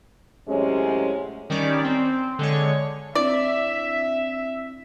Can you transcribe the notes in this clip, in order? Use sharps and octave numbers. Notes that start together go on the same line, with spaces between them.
A2 C3 F#3 G#3 C#4
D#3 G3 C#4 D5
C4
D3 G#3 C#5
C4 D4 E4 D5 E5